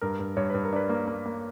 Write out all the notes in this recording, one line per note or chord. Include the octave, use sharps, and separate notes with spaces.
G2 A#4
G2
G2 C#5
G2 B4
A#4
D4 B4
A#3
A#3
A#3